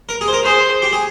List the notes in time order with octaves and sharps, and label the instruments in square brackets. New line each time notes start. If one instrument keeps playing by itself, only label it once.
[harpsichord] A#4
G#4
C5
A#4
[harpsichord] G#4 [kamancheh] C5
[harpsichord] G4
G#4